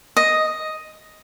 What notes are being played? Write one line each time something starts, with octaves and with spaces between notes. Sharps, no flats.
D#5